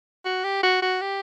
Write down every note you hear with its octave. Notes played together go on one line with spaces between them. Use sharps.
F#4
G4
F#4
F#4
G4